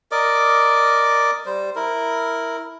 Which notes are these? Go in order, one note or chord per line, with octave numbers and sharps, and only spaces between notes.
A#4 D5 D#5 D6
G3 C5
E4 A#4